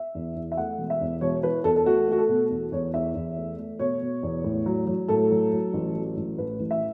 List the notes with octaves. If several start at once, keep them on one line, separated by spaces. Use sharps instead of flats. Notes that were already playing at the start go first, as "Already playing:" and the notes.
Already playing: E5
E2
E2
E5
A3 F#5
E1
E5
E2
E1 C#5
E3 B4
E2 A4
A4
A3 F#4
A3 F#4
A4
B2
E2
E2 C#5
E2 E5
E2
A3
A3
B2 C#5
B2
E2
A2
F#3
F#3
A2 A4
F#3
F#3
A1
F#3
A1
A2 B4
A1
E5